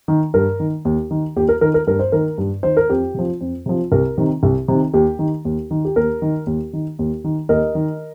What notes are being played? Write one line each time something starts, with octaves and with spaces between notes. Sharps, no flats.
D#3
G2 A#4
D#3
D#2
D#3
D#2 G4
A#4
D#3 A#4
A#4
G2 A#4
C5
D#3 A#4
G2
D#3 C5
A#4
F2 G4
C3 F3
F2
C3 F3
C2 A#4
C3 D#3
C2
C3 D#3
D#2 G4
D#3
D#2
D#3
G4
D#2 A#4
D#3
D#2
D#3
D#2
D#3
D#2 A#4 D#5
D#3